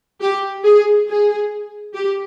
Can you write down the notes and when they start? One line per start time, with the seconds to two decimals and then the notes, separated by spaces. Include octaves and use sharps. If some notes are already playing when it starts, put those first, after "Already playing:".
0.21 G4
0.65 G#4
1.07 G#4
1.94 G4